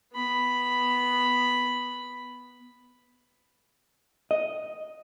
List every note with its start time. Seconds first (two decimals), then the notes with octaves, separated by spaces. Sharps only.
0.13 B3 B5
4.31 D#5